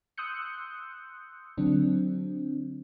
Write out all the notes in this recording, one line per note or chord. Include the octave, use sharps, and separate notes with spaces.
C6 D#6 E6 F#6 G6 C#7
D3 F#3 C4 D4